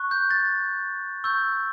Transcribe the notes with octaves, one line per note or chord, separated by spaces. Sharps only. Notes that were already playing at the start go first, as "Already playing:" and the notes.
Already playing: C#6 F#6
G6
A6
C#6 E6 G6